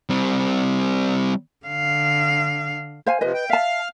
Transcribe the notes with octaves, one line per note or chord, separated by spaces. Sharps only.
G3 C4
D3 F5
C5 F5 G#5
C3 F3 B4 D#5
G5
E5 F5 A5